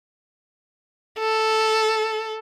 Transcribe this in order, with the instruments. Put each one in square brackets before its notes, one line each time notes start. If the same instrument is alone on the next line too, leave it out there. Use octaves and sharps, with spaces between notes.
[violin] A4